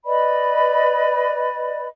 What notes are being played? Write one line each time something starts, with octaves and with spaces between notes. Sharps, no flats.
B4 D5 D#5 B5